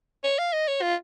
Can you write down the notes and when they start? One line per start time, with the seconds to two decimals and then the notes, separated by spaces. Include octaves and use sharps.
0.24 C#5
0.38 F5
0.53 D#5
0.68 C#5
0.82 F4